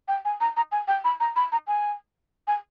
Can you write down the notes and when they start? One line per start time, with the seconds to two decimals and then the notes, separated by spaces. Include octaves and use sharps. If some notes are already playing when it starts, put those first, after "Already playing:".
0.08 G5
0.25 G#5
0.41 A#5
0.57 A#5
0.72 G#5
0.88 G5
1.04 B5
1.20 A#5
1.36 B5
1.52 A#5
1.67 G#5
2.47 G#5